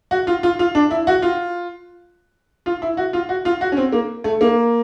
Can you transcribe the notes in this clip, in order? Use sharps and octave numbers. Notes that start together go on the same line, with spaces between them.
F#4
F4
F4
F4
D4
E4
F#4
F4
F4
E4
F#4
F4
F#4
F4
F#4
C#4
C4
A#3
A3
A#3